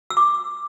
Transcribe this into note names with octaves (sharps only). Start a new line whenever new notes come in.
E6
D6